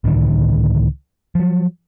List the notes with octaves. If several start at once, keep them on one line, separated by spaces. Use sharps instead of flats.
C#2 A2 D3 D#3
F3 F#3